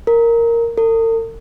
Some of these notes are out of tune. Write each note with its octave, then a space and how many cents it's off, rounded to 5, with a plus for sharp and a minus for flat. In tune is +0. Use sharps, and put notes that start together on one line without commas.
A#4 -5
A#4 -45